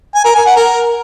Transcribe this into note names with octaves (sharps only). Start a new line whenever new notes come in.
G#5
A#4
G#5
F#5
A#4